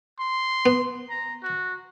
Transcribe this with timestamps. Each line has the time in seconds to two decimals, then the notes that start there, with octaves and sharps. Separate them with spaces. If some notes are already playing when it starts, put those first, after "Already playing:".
0.20 C6
0.66 B3
1.10 A#5
1.43 F#4